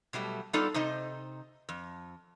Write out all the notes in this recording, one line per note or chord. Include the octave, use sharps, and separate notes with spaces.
B2 F#3 G3 A3
G3 B3 D#4 F4 A4 D5
C3 D#4 C5 D#5
F2